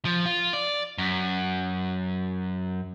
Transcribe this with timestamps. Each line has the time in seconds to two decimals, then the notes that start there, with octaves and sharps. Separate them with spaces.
0.05 F3
0.26 F4
0.53 D5
0.98 F#2